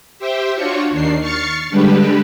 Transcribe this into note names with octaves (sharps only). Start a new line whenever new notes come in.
G4 C5 E5 G5
D4 F4 F#4 C#5 C#6
D#2 D#3 D4 C7
C#6 F6 A6 C7 C#7
D3 G3 G#3 D4 G4 B4